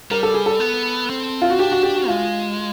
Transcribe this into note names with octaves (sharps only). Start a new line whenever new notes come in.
G3 A#4
A4
G#4
A4
B3
C4
F4
F#4
D4 G4
F#4
G4
F#4
G#3 F4